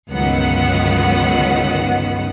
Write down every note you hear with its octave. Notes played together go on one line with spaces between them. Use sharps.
G1 C#2 D#3 F#3 B3 F#5